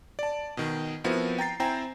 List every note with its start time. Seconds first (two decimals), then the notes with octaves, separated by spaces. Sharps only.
0.19 D5 A5
0.57 B2 D#3
1.04 F3 B3 C4 E4 F#4 A#4
1.38 G5 A#5 A6 C7
1.60 C4 E4 C5 G5 G#5 A#5